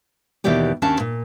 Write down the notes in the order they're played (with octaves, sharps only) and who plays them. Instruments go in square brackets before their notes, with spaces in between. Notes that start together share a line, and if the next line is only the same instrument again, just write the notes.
[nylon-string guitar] D#2 B2 E3 G4 D5 G5
D#2 C#4 D4 A5
A#2